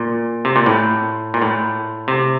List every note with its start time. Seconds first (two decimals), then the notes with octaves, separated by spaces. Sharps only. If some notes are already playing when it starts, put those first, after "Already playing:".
Already playing: A#2
0.45 C3
0.56 A#2
0.66 A2
1.34 A#2
1.42 A2
2.08 C3